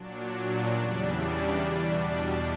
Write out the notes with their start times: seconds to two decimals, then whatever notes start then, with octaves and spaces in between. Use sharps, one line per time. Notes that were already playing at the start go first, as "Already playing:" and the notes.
Already playing: A#2 F#3 D4
0.32 D4
0.73 E2 C#3 E3 G3 D4
1.15 D4
1.56 E2 B2 G3
1.97 D4